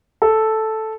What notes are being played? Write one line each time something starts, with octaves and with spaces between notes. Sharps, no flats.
A4